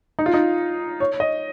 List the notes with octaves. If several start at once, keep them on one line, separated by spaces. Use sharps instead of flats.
D#4
F4
D#4
C#5
D#5